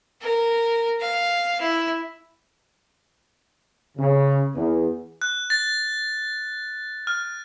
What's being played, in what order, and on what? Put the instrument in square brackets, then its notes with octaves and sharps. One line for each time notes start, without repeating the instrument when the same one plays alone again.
[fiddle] A#4
F5
E4
[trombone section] C#3
E2
[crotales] F#6
A6
F6